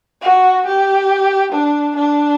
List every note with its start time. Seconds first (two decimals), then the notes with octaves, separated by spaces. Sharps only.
0.21 F#4
0.66 G4
1.52 D4
1.96 D4